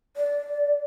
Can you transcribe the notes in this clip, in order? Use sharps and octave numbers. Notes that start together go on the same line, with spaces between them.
D5